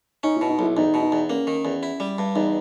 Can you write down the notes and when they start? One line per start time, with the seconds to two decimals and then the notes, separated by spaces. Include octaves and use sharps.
0.23 C#4 D#4
0.37 E4
0.41 B2
0.50 D#4
0.59 B1 E4
0.77 E2 D#4
0.94 B2
1.02 D#4
1.12 E2
1.29 A#3 C#4
1.47 D#3
1.65 E2
1.83 E4
2.00 G3
2.18 G2
2.36 E2 D#4